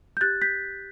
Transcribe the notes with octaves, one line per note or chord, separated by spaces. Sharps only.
G6
G4 F#6 A6
G6 B6